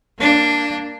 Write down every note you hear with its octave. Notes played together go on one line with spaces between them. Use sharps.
A#3 D4